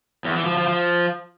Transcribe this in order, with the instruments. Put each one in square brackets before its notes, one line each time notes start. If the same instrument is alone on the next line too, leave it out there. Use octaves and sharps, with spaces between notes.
[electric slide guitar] E2
E3
F3
F3
F3